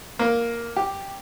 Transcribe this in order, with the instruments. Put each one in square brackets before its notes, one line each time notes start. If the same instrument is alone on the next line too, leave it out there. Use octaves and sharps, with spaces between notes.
[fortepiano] A#3
G4